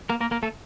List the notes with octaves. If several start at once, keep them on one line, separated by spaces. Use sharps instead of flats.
A#3 A#4
A#3 A#4
A#3 A#4
A3 A4